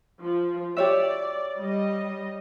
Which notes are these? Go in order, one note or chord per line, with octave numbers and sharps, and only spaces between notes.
F3
G4 C#5 D5 E5
G3 D#5